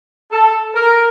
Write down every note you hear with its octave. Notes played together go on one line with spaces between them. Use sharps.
A4
A#4